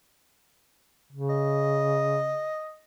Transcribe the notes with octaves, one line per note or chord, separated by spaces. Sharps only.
C#3
D#5